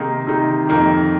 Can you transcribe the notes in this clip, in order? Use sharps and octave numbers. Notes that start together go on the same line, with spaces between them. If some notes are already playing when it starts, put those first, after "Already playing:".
Already playing: C3 D#3 A#3 D#4 G#4
C3 D#3 A#3 D#4 G#4
F2 D#3 A#3 D#4 G4